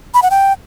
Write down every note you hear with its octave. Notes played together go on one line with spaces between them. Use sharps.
B5
F#5
G5